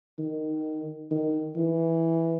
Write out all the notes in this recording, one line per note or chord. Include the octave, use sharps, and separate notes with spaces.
D#3
D#3
E3